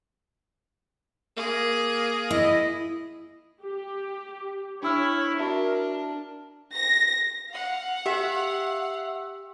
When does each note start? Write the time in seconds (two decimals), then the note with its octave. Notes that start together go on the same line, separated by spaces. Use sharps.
1.37 A#3 G#4
2.30 E4 D#5
3.62 G4
4.83 D4 E4 C#5 E6 F6
5.39 D4 F#4 A#4 E5
6.74 A#6
7.50 F5 F#5
8.06 G4 E5